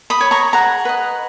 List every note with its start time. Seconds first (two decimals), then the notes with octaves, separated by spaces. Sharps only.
0.10 B5 D#6
0.21 C#5
0.31 A#5 C#6
0.53 G#4 F#5 A#5
0.85 B4 D#5